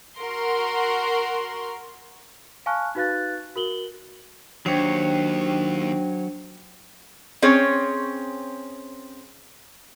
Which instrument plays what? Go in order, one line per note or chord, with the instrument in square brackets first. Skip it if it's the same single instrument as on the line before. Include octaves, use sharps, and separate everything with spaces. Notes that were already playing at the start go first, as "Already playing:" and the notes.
[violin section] F#4 A#4 C6
[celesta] F5 G#5 A5 C#6 F6 F#6
D#4 F#4 B4 F5 F#6 A6
F#4 A#4 F#7 G7
[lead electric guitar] D#2 [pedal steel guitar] F#3 C#5 [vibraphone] D4 C5 G5
[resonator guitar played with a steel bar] C4 C#4 G#4 C#5